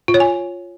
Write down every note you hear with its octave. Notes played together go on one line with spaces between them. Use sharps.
F4
C#5
G#5